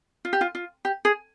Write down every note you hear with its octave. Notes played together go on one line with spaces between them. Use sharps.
F4
G4
F4
F4
G4
G#4